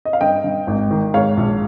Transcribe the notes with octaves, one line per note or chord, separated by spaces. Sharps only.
D#5
F5
G2 D#5 G5
G2
G#1
D#3
G#2 C#5 F5
A#1